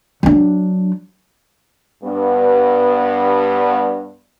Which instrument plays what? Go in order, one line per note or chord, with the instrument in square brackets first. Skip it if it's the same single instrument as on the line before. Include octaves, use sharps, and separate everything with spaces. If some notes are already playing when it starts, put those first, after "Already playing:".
[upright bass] F#3 D4
[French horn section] G2 B3